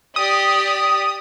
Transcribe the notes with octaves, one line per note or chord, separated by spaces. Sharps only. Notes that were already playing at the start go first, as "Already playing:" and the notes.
G4 D5 D#6